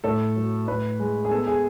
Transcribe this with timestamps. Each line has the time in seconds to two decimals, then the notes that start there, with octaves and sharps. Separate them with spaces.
0.04 A2 A4
0.36 F#3
0.68 A2 B4
1.00 G#3
1.25 G#4
1.31 B3 A4
1.47 G#4